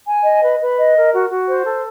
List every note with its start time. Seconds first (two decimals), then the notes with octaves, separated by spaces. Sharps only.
0.07 G#5
0.25 D#5
0.42 B4
0.60 B4
0.78 D#5
0.95 A#4
1.13 F#4
1.31 F#4
1.48 C5
1.67 A4